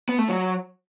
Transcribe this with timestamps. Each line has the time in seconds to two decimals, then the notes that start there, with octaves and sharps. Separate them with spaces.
0.09 B3
0.18 A3
0.29 F#3